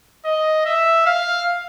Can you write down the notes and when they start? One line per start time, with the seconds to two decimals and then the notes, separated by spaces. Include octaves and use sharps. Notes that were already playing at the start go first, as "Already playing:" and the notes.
0.25 D#5
0.65 E5
1.06 F5